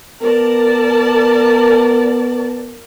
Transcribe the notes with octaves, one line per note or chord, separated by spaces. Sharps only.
B3 A#4 D5 A5